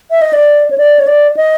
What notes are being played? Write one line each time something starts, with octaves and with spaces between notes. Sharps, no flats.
E5
D#5
D5
C#5
D5
C#5
D5
D#5